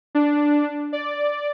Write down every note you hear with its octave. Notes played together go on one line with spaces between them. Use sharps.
D4
D5